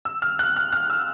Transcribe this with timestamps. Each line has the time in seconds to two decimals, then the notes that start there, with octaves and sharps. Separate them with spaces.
0.05 E6
0.22 F6
0.39 F#6
0.56 F6
0.72 F6
0.90 E6